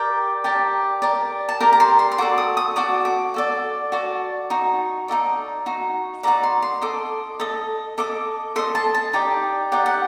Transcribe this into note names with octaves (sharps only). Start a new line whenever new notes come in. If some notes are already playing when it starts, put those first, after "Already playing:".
Already playing: G4 A#4 D5 G5
G4 A#4 D5 A5
G4 A#4 D5
A5
G4 A#4 D5 A#5
A#5
C6
C6
C6
F#4 A4 D5 D6
D#6
D#6
F#4 A4 D5 D6
D6
F#4 A4 D5
F#4 A4 D5
D#4 F#4
D#4 F#4 A4 D5
D#4 F#4
D#4 F#4 A4 D5 A#5
C6
C6
A4 D#5 D6
A4 D#5
A4 D#5 D6
A4 D#5 C6
A5
A5
D#4 G4 D5 G5
D#4 G4 D5 F#5
F#5